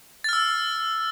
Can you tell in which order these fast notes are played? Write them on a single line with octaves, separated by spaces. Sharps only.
A6 F6 E6